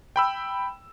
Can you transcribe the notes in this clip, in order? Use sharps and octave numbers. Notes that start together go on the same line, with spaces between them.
G5 B5 E6